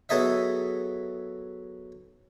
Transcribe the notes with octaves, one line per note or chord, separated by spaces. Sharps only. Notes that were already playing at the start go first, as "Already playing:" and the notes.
F#3 B3 G#4 A4 D#5 E5